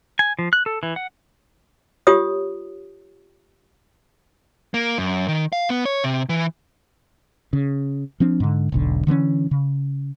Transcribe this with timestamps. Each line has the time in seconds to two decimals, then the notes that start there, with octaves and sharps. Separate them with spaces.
0.19 G#5
0.39 F3
0.53 F#6
0.66 A4
0.83 E3
0.96 F#5
2.07 F4 G4 C#5 D#6
4.74 A#3
4.98 F#2
5.28 D#3
5.52 F5
5.70 B3
5.85 C#5
6.04 C3
6.29 E3
7.53 C#3
8.20 F3 C4 D4
8.40 G#2 D3
8.72 E1 B1 D3
9.07 D3 E3 A#3 C#4
9.51 C#3